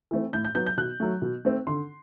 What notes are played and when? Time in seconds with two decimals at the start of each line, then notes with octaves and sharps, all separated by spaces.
0.11 E3 A3 C4
0.33 A2 G6
0.45 G6
0.55 F#3 B3 G6
0.66 G6
0.77 B2 F#6
1.00 F#3 A3
1.22 B2
1.45 A3 C4
1.67 D3 C6